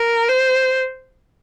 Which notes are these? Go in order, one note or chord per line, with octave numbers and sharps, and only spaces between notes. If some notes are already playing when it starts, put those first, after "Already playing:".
Already playing: A#4
C5